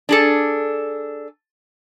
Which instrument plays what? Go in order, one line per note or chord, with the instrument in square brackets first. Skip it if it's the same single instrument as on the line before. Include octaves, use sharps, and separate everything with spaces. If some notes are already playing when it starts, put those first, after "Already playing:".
[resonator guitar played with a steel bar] D4 G#4 A4